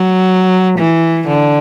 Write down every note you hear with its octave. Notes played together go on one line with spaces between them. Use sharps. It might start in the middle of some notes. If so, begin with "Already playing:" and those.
Already playing: F#3
E3
D3